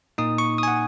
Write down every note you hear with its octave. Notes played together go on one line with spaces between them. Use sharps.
A#2 A#3 D#4 D#6
C#6
D#6
G#5
F#5